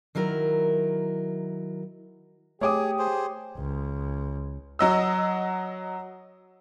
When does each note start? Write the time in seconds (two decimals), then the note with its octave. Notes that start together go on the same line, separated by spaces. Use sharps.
0.15 D#3 F#3 E4 A#4
2.61 A3 G4 G#4 C#5 D6 D#6
2.99 G#4 C5
3.57 C#2
4.79 F#3 D#5 E6